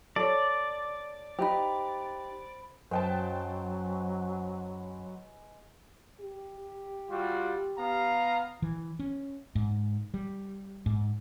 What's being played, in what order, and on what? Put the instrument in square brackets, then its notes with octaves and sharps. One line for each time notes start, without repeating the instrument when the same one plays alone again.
[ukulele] A4 C#5 [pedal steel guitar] D5
[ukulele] D#4 G4 [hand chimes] C5 B5
[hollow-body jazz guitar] F#2 [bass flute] F#3 [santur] G#3 B4 [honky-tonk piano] C5 G5 A5
[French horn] G4
[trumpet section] G3 F4 F#4
B3 F5 A#5
[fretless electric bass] E3
C#4
G#2
G3
G#2